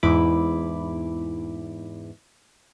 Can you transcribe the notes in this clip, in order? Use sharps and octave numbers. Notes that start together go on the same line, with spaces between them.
E2 G#2 E4 B5 D6